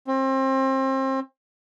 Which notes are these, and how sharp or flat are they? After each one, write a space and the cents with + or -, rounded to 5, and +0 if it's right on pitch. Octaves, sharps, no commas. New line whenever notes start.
C4 +30